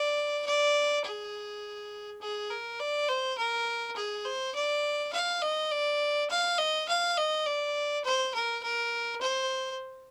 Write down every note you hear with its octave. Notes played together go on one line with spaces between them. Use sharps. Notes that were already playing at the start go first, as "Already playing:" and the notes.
Already playing: D5
D5
G#4
G#4
A#4
D5
C5
A#4
G#4
C5
D5
F5
D#5
D5
F5
D#5
F5
D#5
D5
C5
A#4
A#4
C5